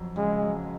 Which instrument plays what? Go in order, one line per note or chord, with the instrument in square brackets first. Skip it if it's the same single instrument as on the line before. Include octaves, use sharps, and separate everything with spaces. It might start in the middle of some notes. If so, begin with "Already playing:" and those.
Already playing: [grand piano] F2 F#3
[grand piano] C#3 [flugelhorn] G#3
[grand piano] F#3